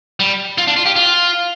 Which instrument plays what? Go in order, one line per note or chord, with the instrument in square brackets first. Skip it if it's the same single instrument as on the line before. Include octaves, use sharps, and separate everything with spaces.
[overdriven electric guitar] G3
F4
D4
F4
G4
F4